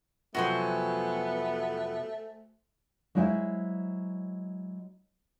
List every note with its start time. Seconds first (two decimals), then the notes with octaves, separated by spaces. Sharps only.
0.35 F2 C3 F#3 A3 B3 F#4 G#4 C5
3.15 F#3 G#3 E4 C5 D5 E5